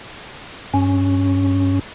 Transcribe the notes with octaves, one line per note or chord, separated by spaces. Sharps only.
G2 C#4